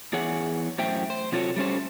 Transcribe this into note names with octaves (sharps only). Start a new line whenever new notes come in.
E2 E3 G#4 C#5 F#5
F#2 A2 A3 C5 E5 G5
C5
C3 F#3 F4 A4 C5 C#5
G3 A3 C#4 C5